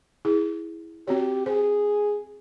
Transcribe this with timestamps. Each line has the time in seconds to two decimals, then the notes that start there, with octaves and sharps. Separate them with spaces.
0.25 E4 G#4
1.07 C4 F#4 G4 C#5
1.46 G#4 C5